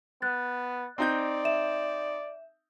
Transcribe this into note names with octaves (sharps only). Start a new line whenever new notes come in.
B3 F#6 A6
C4 D#4 D5 G6
E5 E7